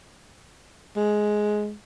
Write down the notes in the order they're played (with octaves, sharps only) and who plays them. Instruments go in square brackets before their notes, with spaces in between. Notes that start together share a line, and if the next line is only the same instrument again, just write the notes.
[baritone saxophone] G#3